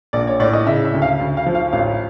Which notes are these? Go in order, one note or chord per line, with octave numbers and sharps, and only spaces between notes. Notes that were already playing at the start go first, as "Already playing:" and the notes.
A#1 D5
C#5
A2 D5
D#5
C#3 E5
E5
D2
F5
D2
F5
F3
F5
A1 F5